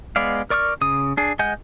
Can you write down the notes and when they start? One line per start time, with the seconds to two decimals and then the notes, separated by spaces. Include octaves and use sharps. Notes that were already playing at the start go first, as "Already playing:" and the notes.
0.16 G#3 B3 D5 F5
0.50 A#4 D5 C#6 D#6 F6
0.81 C#3 D#6
1.17 D4 G#4
1.39 G#3 D#5 F#5 G#5 G6